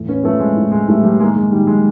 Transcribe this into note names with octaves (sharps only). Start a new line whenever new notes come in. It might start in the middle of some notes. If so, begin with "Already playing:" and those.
Already playing: E2 A2
B3 C#4
F3 A3 B3
G#3
A2
G#3
A2 G3 A3
G3 A3
D#3 G#3 A#3
G#3
D#3 G3
G#3